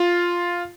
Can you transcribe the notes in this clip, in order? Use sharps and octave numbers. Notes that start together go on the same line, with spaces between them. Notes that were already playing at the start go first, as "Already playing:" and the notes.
Already playing: F4